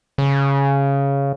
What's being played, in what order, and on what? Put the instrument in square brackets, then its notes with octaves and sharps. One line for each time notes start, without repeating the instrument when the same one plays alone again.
[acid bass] C#3